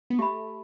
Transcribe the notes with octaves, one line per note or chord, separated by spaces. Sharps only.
B3
A3 G4 E5 B5